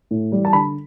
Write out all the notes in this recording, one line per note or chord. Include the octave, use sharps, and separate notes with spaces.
A2
E3 G3
A5
D3 B5